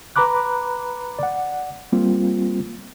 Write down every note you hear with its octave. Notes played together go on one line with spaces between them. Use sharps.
B4 A#5 B5 D6 F#6
D5 F#5
G3 A#3 C4 F4